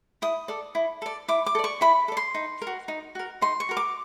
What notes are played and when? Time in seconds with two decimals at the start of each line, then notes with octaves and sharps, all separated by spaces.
0.22 E4 D#6
0.48 A4 D5
0.75 E4
1.02 A4 D5
1.28 E4 D6
1.46 D6
1.55 A4 D5
1.64 C#6
1.81 E4 B5
2.08 A4 D5
2.17 C6
2.35 D#4
2.62 A#4
2.67 F#4
2.88 D#4
3.15 F#4 A#4
3.41 D#4 C6
3.60 C#6
3.69 F#4 A#4
3.77 D6